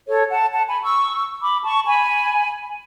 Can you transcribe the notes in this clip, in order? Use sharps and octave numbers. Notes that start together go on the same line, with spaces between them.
A4 C#5
F#5 A5
F#5 A5
G#5 B5
C#6 E6
B5 D6
A5 C#6
G#5 B5